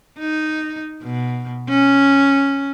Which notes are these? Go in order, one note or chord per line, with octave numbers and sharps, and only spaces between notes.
D#4
B2
C#4